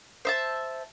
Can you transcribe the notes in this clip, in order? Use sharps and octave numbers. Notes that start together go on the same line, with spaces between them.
C5 E5 A5